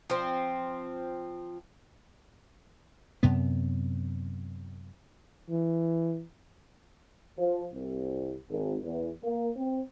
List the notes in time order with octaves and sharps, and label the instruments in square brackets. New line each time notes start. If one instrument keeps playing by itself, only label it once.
[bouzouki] F3 C4
[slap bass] F#2 C3 B3
[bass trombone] E3
[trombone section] F3
C2
G#1
E2
A#3
C4